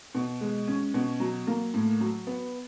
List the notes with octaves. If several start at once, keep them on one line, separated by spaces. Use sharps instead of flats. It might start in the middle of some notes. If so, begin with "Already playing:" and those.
B2
G#3
C#4
B2
F#3
A#3
A2
F#3
B3